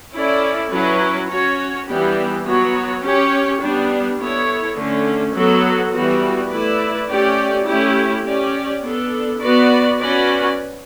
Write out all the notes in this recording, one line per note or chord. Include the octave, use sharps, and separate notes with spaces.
C#4 E4 A4 D5
F#3 C#4 E4 B4
C#4 F#4 C#5
E3 G3 B3 D4 G4
F#3 B3 F#4 C#5
C#4 G4 C#5
G3 B3 D4
B3 E4 A4 C#5
D3 A3 C#4
F#3 B3 F#4 A4
E3 G3 B3 F#4
A3 E4 B4 D5
A3 C#4 G4 D5
A3 C#4 E4 G4
C#4 G4 D5
B3 D4 A4
B3 F#4 B4 D5
C#4 F#4 B4 D5